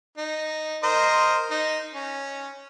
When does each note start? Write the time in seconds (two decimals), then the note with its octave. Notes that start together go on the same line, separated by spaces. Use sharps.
0.18 D#4
0.83 A#4 C5 D#5
1.51 D#4
1.94 C#4